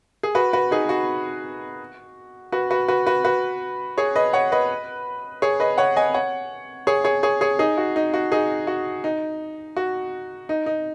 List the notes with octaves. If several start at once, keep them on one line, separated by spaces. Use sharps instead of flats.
G#4
F#4 B4
F#4 B4
D#4 G#4
F#4
F#4 B4
F#4 B4
F#4 B4
F#4 B4
F#4 B4
G#4 C#5
B4 D#5
C#5 F#5
B4 D#5
G#4 C#5
B4 D#5
C#5 F#5
D#5 G#5
C#5 F#5
G#4 C#5
G#4 C#5
G#4 C#5
G#4 C#5
D#4 G#4
F#4
D#4
F#4
D#4 G#4
F#4
D#4
F#4
D#4
D#4